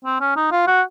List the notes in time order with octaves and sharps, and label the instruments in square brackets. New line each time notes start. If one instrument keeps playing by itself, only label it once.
[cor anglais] C4
C#4
D#4
F4
F#4